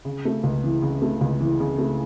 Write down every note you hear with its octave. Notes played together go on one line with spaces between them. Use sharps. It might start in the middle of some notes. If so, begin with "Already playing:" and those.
C#3
A3
C#2
E3
C#3
A3
C#2
E3
C#3
A3